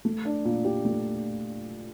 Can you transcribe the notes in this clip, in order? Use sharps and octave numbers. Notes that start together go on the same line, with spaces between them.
A3
D4
A#2
G4
A3